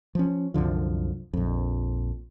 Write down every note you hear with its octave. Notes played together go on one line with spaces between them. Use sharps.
F3 C#4
C2 F#2 D3 F3
A#1 F2